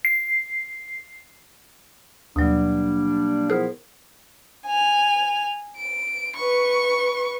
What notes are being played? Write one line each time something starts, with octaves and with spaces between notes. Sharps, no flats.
C7
D#2 B2 F#3 G3 A#3 D4
F3 B3 E4 G#4 A#4 C5
G#5 F7
D7
B4 C#6